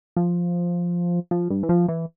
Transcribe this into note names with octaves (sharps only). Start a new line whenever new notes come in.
F3
F3
G2
E3
F3
E3